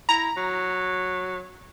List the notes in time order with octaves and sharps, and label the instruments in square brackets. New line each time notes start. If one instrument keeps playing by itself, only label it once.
[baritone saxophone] E4 [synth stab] A#5
[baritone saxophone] F#3